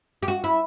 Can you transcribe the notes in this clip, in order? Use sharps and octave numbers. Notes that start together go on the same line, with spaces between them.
G4
F#4
E4